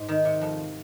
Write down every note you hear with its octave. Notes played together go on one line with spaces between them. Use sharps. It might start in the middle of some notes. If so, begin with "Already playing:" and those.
Already playing: G#2
D#3
C3
F2